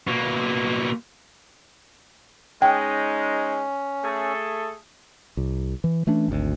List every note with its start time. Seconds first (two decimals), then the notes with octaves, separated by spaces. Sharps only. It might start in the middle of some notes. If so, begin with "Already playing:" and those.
0.07 B2 A#3
2.62 G#3 C#4 D#4 G5
4.03 A3 G#4 A4
5.37 C2
5.84 E3
6.07 E3 A3 C#4 D4
6.28 G#1 D2